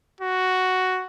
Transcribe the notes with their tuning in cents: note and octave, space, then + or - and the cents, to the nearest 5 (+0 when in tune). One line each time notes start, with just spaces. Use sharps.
F#4 +5